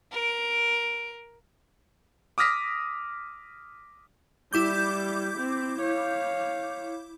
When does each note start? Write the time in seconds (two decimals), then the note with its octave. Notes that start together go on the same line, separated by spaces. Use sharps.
0.12 A#4 D7
2.38 D6 D#6 F6 A#6 B6
4.53 G3 E4 D6 G6
5.38 C4
5.80 C#5 F5